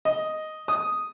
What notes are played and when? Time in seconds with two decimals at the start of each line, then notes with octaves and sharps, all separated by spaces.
0.05 D#5
0.68 D#6